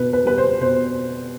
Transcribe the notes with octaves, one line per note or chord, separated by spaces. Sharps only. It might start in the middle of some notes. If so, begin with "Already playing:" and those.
Already playing: B2 B4
B4
G3 B4
C5
B2 C5